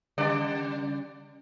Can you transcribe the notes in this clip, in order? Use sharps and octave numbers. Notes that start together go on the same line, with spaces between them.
C#3 G3 D5